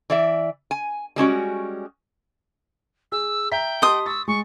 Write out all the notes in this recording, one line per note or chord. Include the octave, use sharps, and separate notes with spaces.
E3 D5 E5
G#5
G3 G#3 C#4 F#4
G#4 E6
E5 G5 A#5 B6
G4 D#5 A5 C6 D#6
C#6 E6 A6
G#3 C#6